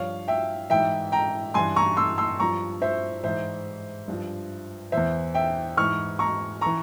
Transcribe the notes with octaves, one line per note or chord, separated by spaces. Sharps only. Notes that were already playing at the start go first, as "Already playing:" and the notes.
Already playing: G2 F3 C#5 F5
E5 G5
G#2 E3 E5 G5
G5 A#5
G2 E3 G#5 C6
A#5 C#6
C6 E6
C6 E6
G2 F3 A#5 C#6
C5 E5
G#2 E3 C5 E5
G2 F3
E2 E3 C5 E5
E5 G5
G#2 E3 C#6 F6
A#5 C#6
E3 A#5 C#6